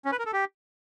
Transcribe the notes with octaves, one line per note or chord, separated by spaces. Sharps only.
C#4
B4
A#4
A4
G4